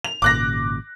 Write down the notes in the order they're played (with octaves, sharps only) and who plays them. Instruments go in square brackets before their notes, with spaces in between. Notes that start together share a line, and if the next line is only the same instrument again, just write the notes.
[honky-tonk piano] F7
[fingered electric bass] G#1 A#2 C#3 [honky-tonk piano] D6 F#6 A#6